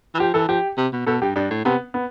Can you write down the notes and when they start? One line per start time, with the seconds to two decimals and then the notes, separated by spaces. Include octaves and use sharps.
0.15 E3
0.19 F3 G4
0.34 E3 A4
0.49 F3 G4
0.77 C3
0.93 B2
1.06 B2 A4
1.21 G2 G4
1.36 G2 D4
1.51 A2
1.65 C3 B3
1.94 B3